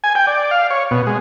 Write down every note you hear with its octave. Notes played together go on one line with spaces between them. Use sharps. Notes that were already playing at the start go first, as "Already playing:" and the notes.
G#5
G5
D5
F5
C#5
B2
G#3